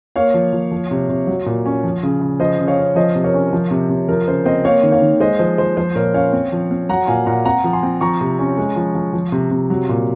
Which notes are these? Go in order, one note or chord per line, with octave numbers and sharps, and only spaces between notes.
A#3 C#5 F5
F3
F3
F3
C3
C3
F#3
A#2
C#4
F3
C#3
C#3
F3 C5 D#5
C#3
C#5 F5
C#4
F3 C5 D#5
C3
A#4 C#5
C#4
F3
C3
C3
F3 A#4
C#3 C5
C4 C5 D#5
A#3 C#5 F5
D#3
C#5 F5
D#3
G#3 C5 D#5
F3 C5
F3 C5
F3 C5
A#2 A#4 C#5
C#4 C#5 F5
C4
F3
C4
F#3 F#5 A#5
A#2 F5 G#5
A#2 F#5 A#5
C4 F#5 A#5
F3
G#5 C6
C4
F3 A#5 C#6
C3
C#4
G#3
F3
F3
F3
C3
C3
F#3
A#2